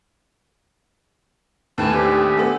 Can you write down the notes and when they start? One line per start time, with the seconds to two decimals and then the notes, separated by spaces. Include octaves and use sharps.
1.78 D#2 A2 B4 G#5 A5
1.93 C4 D4 G4
2.12 G#4
2.37 A3 B3